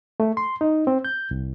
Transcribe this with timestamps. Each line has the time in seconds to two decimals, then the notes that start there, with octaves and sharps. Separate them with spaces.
0.20 A3
0.37 C6
0.61 D#4
0.87 C4
1.05 G6
1.31 C2